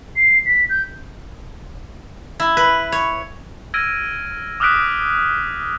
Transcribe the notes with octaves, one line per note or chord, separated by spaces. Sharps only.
C7
B6
G6
E4
B4
C#5
E6 F6 G#6 A#6 D7 D#7
D6 D#6 F6 F#6 B6 D7